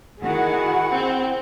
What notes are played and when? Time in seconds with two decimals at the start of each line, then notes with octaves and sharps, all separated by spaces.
0.21 D#3 E4 F#4 G#4 F#5
0.91 C4